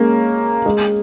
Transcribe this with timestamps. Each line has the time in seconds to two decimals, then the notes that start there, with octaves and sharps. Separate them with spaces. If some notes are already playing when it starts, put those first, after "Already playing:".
Already playing: G#3 A#3 C#4
0.66 G#3